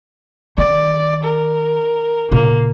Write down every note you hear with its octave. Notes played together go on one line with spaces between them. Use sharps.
D3 D#3 D5
A#4
A#2 C#3 A#3